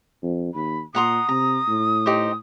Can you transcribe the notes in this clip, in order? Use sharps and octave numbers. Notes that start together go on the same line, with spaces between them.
F2
D#2 B5
A#2 F#5 A#5 C6 D#6
C3 A#5
A2
D#4 G4 C5